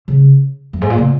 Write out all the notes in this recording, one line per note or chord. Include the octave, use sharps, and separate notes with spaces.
C#3
F#2
G#2
A#2
C#3